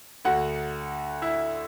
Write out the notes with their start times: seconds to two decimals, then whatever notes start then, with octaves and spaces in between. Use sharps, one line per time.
0.25 D2 D3 F#4 F#5
1.22 E4 E5